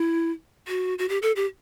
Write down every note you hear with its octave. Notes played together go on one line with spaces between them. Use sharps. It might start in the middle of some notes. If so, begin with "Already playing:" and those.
Already playing: E4
F#4
F#4
G4
A4
G4